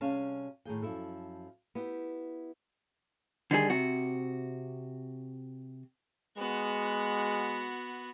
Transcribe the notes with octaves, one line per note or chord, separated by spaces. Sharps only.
C3 G3 C#4 G#4 F5 A5
A2 D#3 G#4 G5
F#2 F3 E4 A4
B3 E4 G4 G5
D3 D#3 G3 G#4
C3 F#4
G#3 B3 F#4